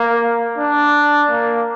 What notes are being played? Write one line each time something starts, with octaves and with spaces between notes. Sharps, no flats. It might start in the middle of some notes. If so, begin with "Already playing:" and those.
Already playing: A#3
D4
A#3